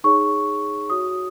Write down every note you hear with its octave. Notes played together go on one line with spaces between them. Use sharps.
D#4 G#4 C#5 C#6
F#4 C#5 D#6